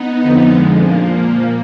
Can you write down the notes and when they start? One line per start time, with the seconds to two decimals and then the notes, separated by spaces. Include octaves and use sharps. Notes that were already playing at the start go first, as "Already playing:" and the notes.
Already playing: B3 D#4
0.21 F2 D3 F3
0.51 G#3
0.81 A#2 F3 A#3